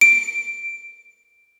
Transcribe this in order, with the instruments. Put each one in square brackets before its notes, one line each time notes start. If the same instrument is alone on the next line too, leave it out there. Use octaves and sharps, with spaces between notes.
[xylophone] D7